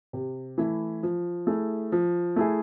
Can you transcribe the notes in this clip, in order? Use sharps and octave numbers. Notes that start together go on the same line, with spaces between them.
C3
E3 A3 E4
F3
A3 E4 G#4
F3
A3 E4 G#4